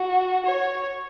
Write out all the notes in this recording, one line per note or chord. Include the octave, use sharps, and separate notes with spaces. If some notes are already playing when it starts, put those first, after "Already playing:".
Already playing: F#4
C#5